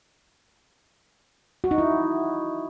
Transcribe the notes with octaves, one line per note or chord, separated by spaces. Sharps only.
F#4
D#4
E4